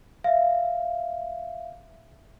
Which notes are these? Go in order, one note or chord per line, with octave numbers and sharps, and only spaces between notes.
E5 F5